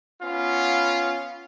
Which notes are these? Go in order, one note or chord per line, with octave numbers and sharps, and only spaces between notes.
B3 C#4 F4